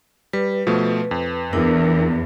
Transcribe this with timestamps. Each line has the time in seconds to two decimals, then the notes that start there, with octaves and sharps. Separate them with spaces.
0.33 G3 B4
0.67 B2 F3 A3
1.11 F2
1.53 E2 D4 E4 A#4